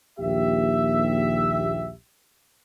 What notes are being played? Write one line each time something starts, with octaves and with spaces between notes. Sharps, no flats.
A#1 D#2 G4 E5